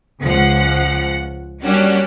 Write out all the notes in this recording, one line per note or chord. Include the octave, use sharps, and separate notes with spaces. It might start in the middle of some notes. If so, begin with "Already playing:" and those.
C#2 F3 F#5
G3 A#3 C#4 D4 F#4 G4